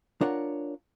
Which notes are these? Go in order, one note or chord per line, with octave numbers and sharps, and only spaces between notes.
D4 F4 A#4 C#5 F#5